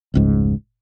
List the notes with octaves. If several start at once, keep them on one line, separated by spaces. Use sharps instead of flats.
F1 C#2 G#2